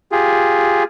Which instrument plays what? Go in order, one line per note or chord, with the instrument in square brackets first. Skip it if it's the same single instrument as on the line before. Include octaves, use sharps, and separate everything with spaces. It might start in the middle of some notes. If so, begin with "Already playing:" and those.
[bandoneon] F4 G4 G#4